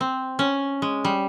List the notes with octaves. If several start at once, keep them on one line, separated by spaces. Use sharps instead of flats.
C4
C#4
G#3
G3